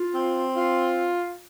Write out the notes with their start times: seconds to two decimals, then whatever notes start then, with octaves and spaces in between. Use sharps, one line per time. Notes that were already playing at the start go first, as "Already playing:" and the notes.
Already playing: F4
0.14 C4
0.55 F4